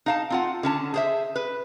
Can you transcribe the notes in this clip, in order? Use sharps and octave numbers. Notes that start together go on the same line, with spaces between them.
D#4 F5 A5
C4 F4 F#5
D3 C#4 A5
G#4 C5 E5
B4